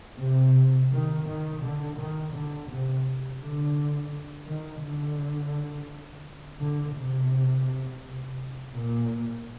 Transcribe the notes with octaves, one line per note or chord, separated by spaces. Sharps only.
C3
D#3
D#3
D3
D#3
D3
C3
D3
D#3
D3
D3
C3
A#2